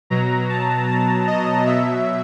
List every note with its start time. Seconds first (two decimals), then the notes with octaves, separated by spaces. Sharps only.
0.10 B2 F#3 A#5
0.49 A5
0.88 A5
1.27 D#5
1.66 B2 F#3 E5